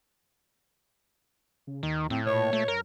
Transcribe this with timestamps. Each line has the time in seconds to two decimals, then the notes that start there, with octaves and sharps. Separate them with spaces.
1.67 C#3
1.83 D#2 D#3
2.10 A2 C4
2.26 A#2 C#5
2.53 A3
2.68 F#2 A#4